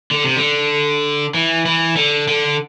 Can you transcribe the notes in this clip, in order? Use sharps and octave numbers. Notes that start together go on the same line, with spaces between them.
D3
C3
D3
E3
E3
D3
D3